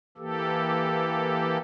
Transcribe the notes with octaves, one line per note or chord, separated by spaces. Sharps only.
E3 A#3 G4 A4